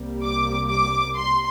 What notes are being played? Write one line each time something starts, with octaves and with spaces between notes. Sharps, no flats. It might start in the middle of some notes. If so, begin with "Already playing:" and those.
Already playing: C2 C3 G3 A#3
D6
D6
C6